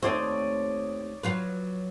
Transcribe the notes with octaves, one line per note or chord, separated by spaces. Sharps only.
D#2 A3 C4 C#5 D5 D#6
F#3 F4 B4